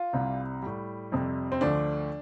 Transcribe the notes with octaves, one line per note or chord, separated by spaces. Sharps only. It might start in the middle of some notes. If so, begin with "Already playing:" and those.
Already playing: F4
C2 C3 G3
A2 G3
F2 C3 G3
C4
D2 D3 F3 A3 D4